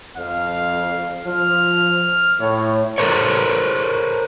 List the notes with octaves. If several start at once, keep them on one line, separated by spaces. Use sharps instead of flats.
F2 F5
F3 F6
A2 C#5
A4 A#4 C5 C#5